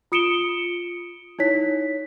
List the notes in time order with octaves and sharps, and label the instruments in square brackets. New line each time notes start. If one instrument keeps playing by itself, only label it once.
[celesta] F4 D#6 C#7 D7 E7 G7
D#4 E4 C#5 B6